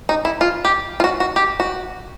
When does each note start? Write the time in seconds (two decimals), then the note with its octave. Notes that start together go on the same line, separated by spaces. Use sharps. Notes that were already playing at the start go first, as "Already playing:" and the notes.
0.09 D#4
0.25 E4
0.41 F4
0.65 G4
1.00 F4
1.04 F#4
1.20 F#4
1.36 G4
1.60 F#4